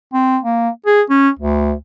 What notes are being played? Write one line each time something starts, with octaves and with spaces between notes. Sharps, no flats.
C4
A#3
G#4
C#4
D2